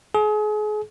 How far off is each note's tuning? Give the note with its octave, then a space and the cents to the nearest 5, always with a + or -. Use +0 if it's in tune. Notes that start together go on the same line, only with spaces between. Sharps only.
G#4 +35